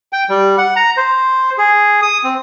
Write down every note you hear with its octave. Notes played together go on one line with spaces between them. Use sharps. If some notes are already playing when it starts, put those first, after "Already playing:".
G5
G3
F#5
A#5
C5
G#4
D#6
C4